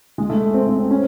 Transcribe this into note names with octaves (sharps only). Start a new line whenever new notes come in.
G#3
A3
C4
A3
C4
C#4